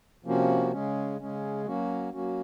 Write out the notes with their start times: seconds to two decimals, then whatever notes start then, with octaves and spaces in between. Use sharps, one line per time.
0.25 C3 F3 A#3 C#4 F#4
0.71 C#3 G#3 C#4
1.19 C#3 G#3 C#4
1.66 F#3 A#3 C#4 F#4
2.13 F#3 A#3 C#4 F#4